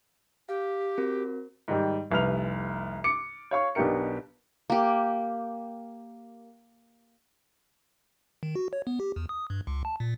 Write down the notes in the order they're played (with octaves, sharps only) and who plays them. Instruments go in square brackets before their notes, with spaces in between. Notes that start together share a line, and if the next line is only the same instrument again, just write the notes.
[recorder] G4 [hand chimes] F5
[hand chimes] C4 F#4 A#4
[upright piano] G#2 D#3 G3
F1 C2 B4 F6 F7
D6 C#7
C#5 F5 C#6
B1 B2 D4 G4 A#4 C#7
[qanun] A#3 G4
[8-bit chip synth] D#3
F#4
C#5
B3
G4
E2
D#6
G2
C#2
A5
A#2